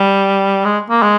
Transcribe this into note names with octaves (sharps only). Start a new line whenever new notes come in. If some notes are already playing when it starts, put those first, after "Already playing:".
Already playing: G3
G#3
A#3
G#3